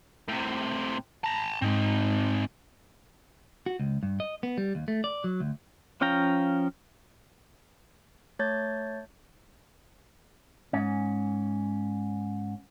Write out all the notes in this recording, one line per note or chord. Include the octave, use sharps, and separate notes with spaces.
A2 C3
A5 A#5
G#2 G#3 C4 D#4
F#4
C#2
G2
D#5
B3
G3
D#2
A3
D5
F#3
D2
F3 C#4 F5 G5 A#5
A3 C#5 A5 G6 A6
G#2 C#4